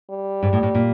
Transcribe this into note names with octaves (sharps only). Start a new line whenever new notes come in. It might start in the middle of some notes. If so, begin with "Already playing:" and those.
G3
G#2
A2
A2
A#2